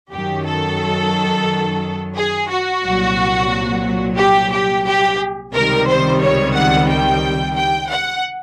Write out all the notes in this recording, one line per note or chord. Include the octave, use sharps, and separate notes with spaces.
F#2 D#3 F#3 G4
A4
G#4
F#4
C2 A#2 F#3
G4
G4
G4
C#2 C3 D#3 G3 A#4
C5
C#5
F#5
G5
G5
F#5